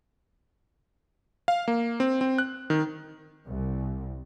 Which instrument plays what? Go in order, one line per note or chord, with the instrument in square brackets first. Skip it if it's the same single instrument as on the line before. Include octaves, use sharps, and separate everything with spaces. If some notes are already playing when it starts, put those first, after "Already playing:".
[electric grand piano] F5
A#3
C4
C4
F#6
D#3
[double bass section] C2